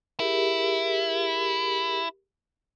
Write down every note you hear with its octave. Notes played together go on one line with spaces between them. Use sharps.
E4 G4 G#4 A#4